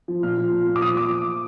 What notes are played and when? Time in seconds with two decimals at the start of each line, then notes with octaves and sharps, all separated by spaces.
0.08 F3
0.23 A#2 F6
0.37 F3
0.52 A#2
0.67 A#2
0.76 D6
0.82 F3 D#6
0.97 F3 D6